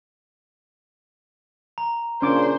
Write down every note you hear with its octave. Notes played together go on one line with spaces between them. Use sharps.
A#5
A#2 C#3 C#4 D4 C5 D6